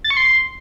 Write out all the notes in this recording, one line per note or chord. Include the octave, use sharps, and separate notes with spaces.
A6
C#6
C6